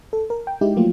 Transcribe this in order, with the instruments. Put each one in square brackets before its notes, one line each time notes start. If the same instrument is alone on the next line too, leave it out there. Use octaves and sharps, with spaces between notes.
[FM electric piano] A4
A#4
G5
G#3 D#4 E4 G4
F3 F#3 A3 A#3 F4